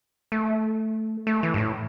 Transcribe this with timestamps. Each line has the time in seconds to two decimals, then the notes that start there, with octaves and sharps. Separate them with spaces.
0.32 A3
1.27 A3
1.43 E3
1.54 G2
1.58 A2